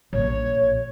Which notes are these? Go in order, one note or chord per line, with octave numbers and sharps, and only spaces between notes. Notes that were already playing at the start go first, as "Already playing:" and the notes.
A#1 C#5